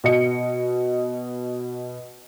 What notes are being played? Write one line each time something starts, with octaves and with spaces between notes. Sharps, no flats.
B2 D#5 C#7